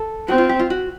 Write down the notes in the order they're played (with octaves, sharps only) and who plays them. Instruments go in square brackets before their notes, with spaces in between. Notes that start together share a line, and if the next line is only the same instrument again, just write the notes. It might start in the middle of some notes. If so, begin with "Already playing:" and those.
Already playing: [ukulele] A4
[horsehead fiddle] C4 [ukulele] F#4
[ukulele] F4
G4
F4
F#4